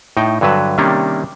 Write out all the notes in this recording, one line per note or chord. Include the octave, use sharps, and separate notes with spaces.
A2 D#4 G5
G2 D3 F#3 B4 A5
C3 D#3 G3 A#3 C#4 D4